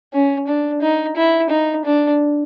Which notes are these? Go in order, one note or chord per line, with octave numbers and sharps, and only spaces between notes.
C#4
D4
D#4
E4
D#4
D4